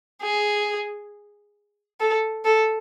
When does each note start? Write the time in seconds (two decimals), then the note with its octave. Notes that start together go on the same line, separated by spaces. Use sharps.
0.22 G#4
2.00 A4
2.45 A4